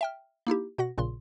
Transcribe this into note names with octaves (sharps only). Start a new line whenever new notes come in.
E5 G5 F6
A#3 D#4 E4 G4
B2 F#4 F#5 A#6
A#1 A#2 C#3 C6